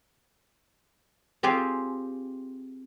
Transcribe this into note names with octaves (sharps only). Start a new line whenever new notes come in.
C4 F4 G4 G#4 C5 G#5